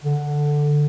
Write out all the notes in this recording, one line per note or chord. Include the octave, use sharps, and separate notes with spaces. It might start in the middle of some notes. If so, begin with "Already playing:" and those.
D3